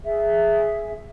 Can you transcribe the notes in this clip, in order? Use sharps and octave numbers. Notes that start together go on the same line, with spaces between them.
G#4 E5